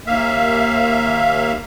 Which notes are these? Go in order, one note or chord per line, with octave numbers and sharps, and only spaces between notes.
D#2 A#3 E5 F5